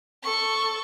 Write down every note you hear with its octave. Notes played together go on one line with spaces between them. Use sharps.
A4 C#6